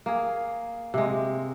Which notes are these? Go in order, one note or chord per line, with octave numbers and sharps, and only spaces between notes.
A#3 G#4
C3 G#3